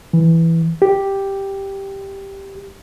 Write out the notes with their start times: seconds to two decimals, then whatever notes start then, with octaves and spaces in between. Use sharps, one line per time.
0.13 E3
0.82 G4